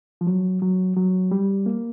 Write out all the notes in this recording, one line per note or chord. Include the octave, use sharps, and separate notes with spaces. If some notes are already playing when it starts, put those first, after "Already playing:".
F3
F#3
F#3
F#3
G3
A#3